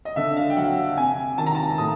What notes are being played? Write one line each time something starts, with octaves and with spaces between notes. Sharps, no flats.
D#5
D3 E5
F5
G5
F#3 F#5
C3 G#5
D#3 A5
A#5
A5
A2 D#6